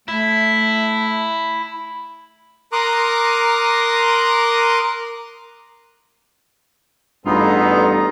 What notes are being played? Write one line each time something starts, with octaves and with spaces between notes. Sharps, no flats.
A3 E4
A#4 A#5 C6 D6 D#6 F#6
A1 G2 B3 D#4 F4 G#4 A4 A#5